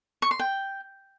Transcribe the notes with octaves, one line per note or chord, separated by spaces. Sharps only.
C#6
C6
G5